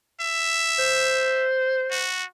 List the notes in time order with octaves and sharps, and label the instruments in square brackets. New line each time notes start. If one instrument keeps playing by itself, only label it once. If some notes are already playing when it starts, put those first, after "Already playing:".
[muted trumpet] E5
[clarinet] C5
[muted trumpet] F#4